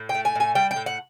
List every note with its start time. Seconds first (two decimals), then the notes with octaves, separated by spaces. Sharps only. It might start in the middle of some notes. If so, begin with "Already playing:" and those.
Already playing: A2
0.09 G5
0.14 A3
0.25 G#5
0.35 A2 G#5
0.55 G3 G5
0.71 G5
0.76 A2
0.86 F#5